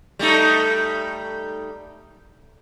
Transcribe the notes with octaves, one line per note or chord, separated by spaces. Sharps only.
G3 A3 D#4